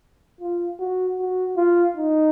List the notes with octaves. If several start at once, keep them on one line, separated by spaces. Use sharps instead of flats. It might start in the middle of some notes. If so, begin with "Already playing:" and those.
F4
F#4
F#4
F4
D#4